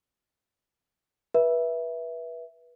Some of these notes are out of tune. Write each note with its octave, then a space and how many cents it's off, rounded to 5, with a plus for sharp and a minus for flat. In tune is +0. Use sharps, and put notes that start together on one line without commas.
B4 -25 E5 +0